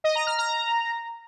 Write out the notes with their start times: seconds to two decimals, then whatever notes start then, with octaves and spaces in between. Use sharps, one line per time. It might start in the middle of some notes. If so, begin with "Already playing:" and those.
0.04 D#5
0.15 A#5
0.27 F6
0.38 A#5